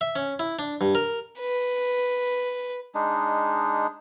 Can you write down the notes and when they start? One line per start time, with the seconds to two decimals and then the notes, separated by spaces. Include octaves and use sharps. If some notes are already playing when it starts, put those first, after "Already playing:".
0.01 E5
0.16 C#4
0.39 E4
0.59 D4
0.81 G2
0.95 A#4
1.40 B4
2.95 G#3 D4 D#4